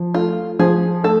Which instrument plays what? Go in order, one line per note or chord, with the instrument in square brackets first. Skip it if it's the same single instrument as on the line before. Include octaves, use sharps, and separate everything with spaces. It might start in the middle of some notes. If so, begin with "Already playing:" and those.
Already playing: [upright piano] F3
[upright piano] A3 [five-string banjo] F4
[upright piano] F3 [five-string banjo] G#4
[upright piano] A3 [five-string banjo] A4